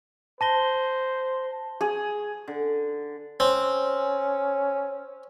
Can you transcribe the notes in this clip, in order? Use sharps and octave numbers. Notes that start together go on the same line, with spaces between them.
C5 A5 A#6 G7
G#4
D3
C4 C#4